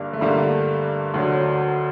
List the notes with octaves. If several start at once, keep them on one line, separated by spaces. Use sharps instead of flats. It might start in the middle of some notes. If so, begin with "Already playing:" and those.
Already playing: G2 D3 G3 A#3
A3
G2 D3 G3 A#3
D2 D3 F#3